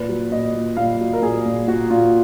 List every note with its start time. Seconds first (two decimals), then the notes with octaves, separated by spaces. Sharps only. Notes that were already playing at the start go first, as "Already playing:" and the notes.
Already playing: A#2 B4
0.09 F#3
0.31 A#2 D#5
0.54 A#2
0.77 A#2 F5
1.00 F#3
1.13 A#4
1.22 A#2 G#4
1.45 A#2
1.67 A#2 F#4
1.90 A#2 F4